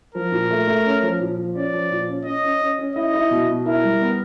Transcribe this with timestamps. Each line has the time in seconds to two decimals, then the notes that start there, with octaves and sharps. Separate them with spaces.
0.14 F3 A#4
0.32 A#2
0.50 A3
0.67 A3
0.85 C#4
1.02 F3
1.20 A#2
1.38 F3
1.55 C#4 D5
1.73 F3
1.90 A#2
2.08 C#4
2.25 C#4 D#5
2.43 C#4
2.61 C#4
2.78 C#4
2.96 E4 D#5
3.14 E4
3.31 B2
3.48 B2
3.65 E4 A#4
3.84 G3
4.01 B3